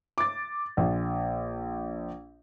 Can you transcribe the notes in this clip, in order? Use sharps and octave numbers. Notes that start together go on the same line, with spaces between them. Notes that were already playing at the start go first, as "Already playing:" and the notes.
D6 A6
A#1